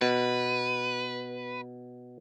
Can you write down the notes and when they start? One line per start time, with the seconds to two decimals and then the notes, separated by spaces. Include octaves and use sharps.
0.01 B2 B4